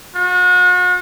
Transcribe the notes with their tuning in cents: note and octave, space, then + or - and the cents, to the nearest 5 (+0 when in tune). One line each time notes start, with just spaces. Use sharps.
F#4 -40